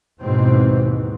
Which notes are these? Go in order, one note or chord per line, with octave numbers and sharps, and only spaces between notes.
D#2 G#2 B2 E3 C4